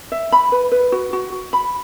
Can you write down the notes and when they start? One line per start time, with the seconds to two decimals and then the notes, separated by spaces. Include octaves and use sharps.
0.12 E5
0.32 B5
0.52 B4
0.72 B4
0.92 F#4
1.13 F#4
1.32 F#4
1.53 B5